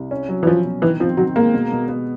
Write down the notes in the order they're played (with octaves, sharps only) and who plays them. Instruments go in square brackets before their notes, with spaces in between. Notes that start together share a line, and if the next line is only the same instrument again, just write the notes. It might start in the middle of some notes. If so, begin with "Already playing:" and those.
Already playing: [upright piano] C2
C#4
F#3
[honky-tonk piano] E3
[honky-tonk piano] F3 [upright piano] C#4
[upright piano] B2
[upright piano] D#3 [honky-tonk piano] E3
[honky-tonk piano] F3 [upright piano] C4
[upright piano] D#3 [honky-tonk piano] F#3
[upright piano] G#3 [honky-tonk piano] A#3
[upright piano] B2
B2
B3